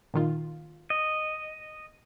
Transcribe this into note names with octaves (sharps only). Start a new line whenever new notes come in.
A#2 D#3 F4
D#5